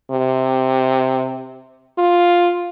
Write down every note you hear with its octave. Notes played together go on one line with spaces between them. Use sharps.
C3
F4